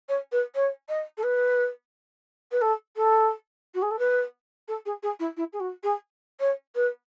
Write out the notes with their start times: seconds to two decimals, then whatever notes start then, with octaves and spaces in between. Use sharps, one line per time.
0.09 C#5
0.32 B4
0.55 C#5
0.89 D#5
1.17 A4
1.23 B4
2.52 B4
2.61 A4
2.96 A4
3.75 F#4
3.82 G#4
3.91 A4
3.99 B4
4.68 A4
4.86 G#4
5.03 G#4
5.20 E4
5.37 E4
5.53 G#4
5.60 F#4
5.83 G#4
6.40 C#5
6.75 B4